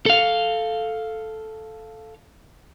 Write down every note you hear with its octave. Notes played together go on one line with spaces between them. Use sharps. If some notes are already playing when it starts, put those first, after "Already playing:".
A4 F5